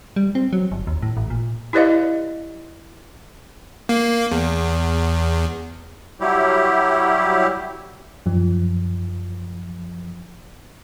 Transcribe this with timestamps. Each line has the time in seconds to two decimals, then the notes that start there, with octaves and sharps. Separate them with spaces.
0.16 G3
0.35 C4
0.53 F#3
0.72 G1
0.87 D#2
1.02 A2
1.17 A1
1.30 A#2
1.73 E4 G4 B4 D5 D#5 F5
3.89 A#3
4.31 E2
6.21 F#3 G3 E4 G4
8.26 F#2 F3